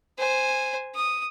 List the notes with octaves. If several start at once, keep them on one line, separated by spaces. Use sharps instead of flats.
C5 G#5
D#6